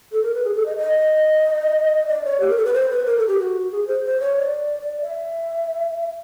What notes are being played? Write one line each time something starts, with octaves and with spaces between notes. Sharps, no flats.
A4
A#4
B4
G#4
A4
D#5
D#5
D5
C#5
G4
A#4
A4
B4
C5
B4
A#4
A4
G4
F#4
G#4
C5
C5
C#5
D5
E5